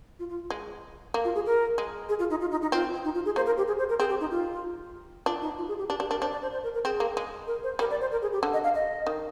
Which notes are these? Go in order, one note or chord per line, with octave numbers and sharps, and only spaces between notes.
F4
F4
G#3
A#3
F4
G#4
A#4
G#3
G#4
F4
D#4
F4
D#4
D#4
C4 F4
D#4
F4
G#4
A#3 C5
A#4
G4
G#4
C5
A#4
C4 G#4
G4
D#4
F4
D4 F4
D#4
F4
G#4
G4
D4 G4
D4 G4
D4 A#4
D4 C5
D5
C5
C5
A#4
A#4
C4 G#4
A#3
G#3
A#4
C5
G3 A#4
D5
C5
A#4
G#4
G4
D3
D#5
F5
D#5
D#3